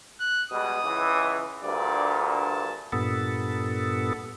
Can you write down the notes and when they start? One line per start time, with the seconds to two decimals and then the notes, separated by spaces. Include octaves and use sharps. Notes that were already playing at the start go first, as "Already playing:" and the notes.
0.20 F#6
0.51 B2 G3 G#3 D#6
0.84 C#2 E3
1.63 D2 G2 A#2 D5
2.27 A5
2.92 G2 A#2 B3 A4